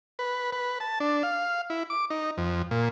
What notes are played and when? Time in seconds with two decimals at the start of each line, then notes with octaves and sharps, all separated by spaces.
0.19 B4
0.53 B4
0.80 A5
1.00 D4
1.23 F5
1.70 E4
1.90 D6
2.10 D#4
2.37 F2
2.71 A#2